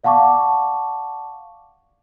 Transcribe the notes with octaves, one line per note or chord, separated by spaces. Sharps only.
D5 F5 F#5 A5 C#6 D6